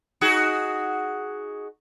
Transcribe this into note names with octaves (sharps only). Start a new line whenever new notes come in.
D#4 F#4 G#4